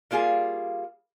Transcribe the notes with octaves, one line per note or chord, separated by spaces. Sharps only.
G3 A#3 F4 G#4